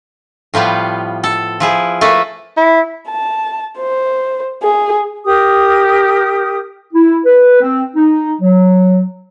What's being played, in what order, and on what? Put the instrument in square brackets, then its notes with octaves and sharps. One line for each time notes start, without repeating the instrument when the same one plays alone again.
[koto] A2 F3 G3 B3 F5
A4
F3 E4 G#4
A3 A#3 A4 B4
[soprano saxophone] E4
[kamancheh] A5
C5
G#4
[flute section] G4 A#4 D#6
[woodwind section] E4
B4
C4
D#4
F#3